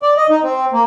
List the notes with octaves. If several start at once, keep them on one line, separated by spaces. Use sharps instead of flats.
D5
D#5
D#4
C4
A#3